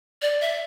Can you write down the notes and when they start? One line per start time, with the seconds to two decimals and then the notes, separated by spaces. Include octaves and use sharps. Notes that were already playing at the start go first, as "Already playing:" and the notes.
0.22 D5
0.41 E5